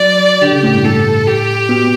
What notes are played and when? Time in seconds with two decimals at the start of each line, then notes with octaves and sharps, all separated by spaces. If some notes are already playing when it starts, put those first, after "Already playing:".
Already playing: F#3 D5
0.42 D3 G4
0.53 C#3
0.63 A2
0.74 G2
0.84 A2 A4
1.26 G4
1.69 B2